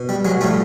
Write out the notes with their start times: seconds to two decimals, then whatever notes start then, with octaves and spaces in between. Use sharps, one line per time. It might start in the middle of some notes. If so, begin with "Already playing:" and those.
Already playing: B2
0.09 G3
0.25 F#3 G#3
0.41 A2 F3 G3 A3